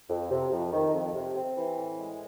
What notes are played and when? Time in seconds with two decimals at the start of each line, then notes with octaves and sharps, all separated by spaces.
0.10 F2
0.31 C3
0.51 F2
0.72 D#3
0.93 F2
1.14 C3
1.36 C4
1.56 E3
1.78 A2
1.98 G#3